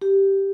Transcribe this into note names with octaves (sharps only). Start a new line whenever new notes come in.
G4